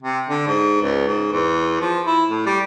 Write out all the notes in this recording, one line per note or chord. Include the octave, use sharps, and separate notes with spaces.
C3
D3
G#2
C#2
G#2
E2
F3
E4
A2
G3